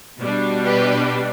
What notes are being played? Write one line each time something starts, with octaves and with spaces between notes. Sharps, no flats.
B2 G3 D4
G4 B4